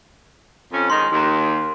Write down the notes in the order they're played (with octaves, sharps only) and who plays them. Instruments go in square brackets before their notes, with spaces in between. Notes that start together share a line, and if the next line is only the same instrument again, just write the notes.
[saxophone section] F2 C#4
[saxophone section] D#3 G#3 D#4 [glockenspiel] C6
[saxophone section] D#2